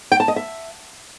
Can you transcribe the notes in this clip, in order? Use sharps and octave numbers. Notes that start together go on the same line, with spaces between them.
G5
A5
D#5
E5